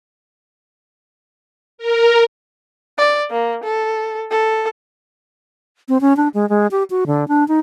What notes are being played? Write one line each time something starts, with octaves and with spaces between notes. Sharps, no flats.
A#4
D5
A#3
A4
A4
C4
C#4
D4
G#3
G#3
G4
F#4
D3
D4
D#4